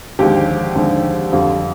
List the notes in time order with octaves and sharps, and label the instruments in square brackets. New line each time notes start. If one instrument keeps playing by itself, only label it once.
[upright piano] D#2 D3 F3 G#3 G4
D#2 D3 F3 G#3
F2 D3 G3 F4